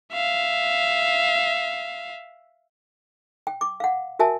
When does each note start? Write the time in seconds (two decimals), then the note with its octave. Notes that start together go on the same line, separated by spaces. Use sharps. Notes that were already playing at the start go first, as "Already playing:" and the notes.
0.13 E5 F5
3.47 G5
3.61 D6
3.80 F5 F#5
4.19 F#4 A#4 E5 G#5 A5